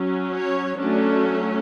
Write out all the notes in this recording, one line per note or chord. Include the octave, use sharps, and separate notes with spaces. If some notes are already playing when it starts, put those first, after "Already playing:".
Already playing: F#3 C#4
C#5
F#3 A3 C#4 D4